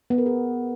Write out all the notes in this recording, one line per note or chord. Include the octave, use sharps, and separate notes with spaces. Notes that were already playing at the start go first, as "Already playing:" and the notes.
B3
A#4
G#4